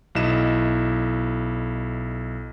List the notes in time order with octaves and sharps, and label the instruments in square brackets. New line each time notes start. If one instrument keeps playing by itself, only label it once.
[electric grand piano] B1 E4 D#5 E7